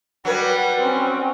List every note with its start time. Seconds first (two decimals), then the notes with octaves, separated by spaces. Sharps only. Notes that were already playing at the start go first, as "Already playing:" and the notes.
0.25 F#3 G3 B4
0.80 C4 C#4